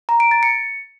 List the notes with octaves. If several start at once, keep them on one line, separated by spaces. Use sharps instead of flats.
A#5
D7
A6
C#7